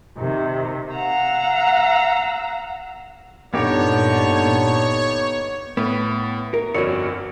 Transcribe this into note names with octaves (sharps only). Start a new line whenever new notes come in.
C3 D#3
F5 F#5 A#5 E6
G1 A#2 D3 B3 D#4 G4 C#5
A2 B3
A#4
G1 F2 F#4 A#4 C#5 D5